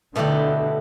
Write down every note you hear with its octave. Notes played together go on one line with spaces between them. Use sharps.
B2 D3 A3 E4 G4